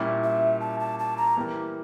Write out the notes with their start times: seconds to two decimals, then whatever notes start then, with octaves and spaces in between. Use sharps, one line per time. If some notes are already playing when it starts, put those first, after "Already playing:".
Already playing: A#2 G3 C#4 E4
0.24 E5
0.60 A5
0.80 A5
0.99 A5
1.17 A#5
1.37 E3 G3 A#3